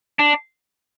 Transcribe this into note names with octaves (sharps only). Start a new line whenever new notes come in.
D4